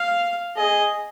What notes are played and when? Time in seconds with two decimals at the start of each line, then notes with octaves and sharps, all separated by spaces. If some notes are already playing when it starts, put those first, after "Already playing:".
Already playing: F5
0.57 G#4 D#5